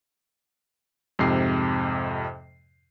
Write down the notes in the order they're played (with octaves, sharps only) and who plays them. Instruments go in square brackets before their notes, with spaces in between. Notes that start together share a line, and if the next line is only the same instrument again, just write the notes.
[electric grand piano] F2 G#2 C3 C7